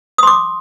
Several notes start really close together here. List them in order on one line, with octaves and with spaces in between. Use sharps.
D#6 C6 D6